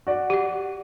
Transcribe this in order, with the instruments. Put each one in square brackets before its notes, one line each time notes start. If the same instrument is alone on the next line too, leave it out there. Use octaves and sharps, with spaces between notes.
[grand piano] F#4 D5
[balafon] G4 F#5